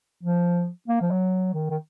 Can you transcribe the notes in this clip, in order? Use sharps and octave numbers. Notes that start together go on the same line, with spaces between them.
F3
A#3
F3
F#3
D#3
D#3